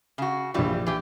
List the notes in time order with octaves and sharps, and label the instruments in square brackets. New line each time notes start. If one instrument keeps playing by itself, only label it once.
[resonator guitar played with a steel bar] C#3 F#4
[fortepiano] A#1 D4 F4 [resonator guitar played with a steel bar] B2 E3 G3
[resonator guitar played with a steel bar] E3 G4